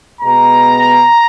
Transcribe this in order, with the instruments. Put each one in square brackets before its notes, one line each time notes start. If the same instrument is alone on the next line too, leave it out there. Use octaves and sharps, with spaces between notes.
[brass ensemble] B2 G#3 B3 A#5